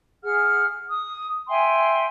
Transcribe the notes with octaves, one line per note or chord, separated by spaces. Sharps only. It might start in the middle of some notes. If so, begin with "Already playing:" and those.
G#4 F#5 F6
D#6
E5 G5 G#5 C6